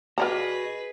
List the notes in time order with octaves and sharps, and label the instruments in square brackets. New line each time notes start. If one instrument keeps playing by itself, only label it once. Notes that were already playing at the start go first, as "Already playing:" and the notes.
[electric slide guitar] F#4 D#5 [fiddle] G#4 B4 [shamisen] A#4 D5 A#5